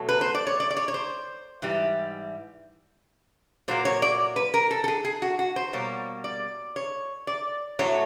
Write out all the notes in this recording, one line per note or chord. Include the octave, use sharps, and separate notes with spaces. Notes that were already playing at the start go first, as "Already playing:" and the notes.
Already playing: B2 F#3 A3
B4
C5
D5
C#5
D5
D5
C#5
C#5
C5
G#2 E3 G3
A#2 F#3 A#3 C5
C#5
D5
B4
A#4
A4
A4
G#4
G#4
F#4
F#4
C5
B2 G3 A#3 C#5
D5
C#5
D5
A2 F#3 A3 C#5